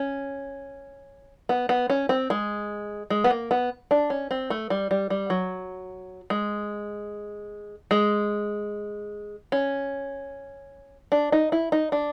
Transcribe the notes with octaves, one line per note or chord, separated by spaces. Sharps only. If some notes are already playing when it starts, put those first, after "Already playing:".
Already playing: C#4
B3
B3
C#4
C4
G#3
G#3
B3
A#3
B3
D4
C#4
C4
A3
G3
G3
G3
F#3
G#3
G#3
C#4
D4
D#4
E4
D#4
D4